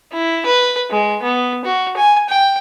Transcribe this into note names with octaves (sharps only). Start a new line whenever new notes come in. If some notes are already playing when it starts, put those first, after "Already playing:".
E4
B4
G#3
B3
F#4
G#5
G5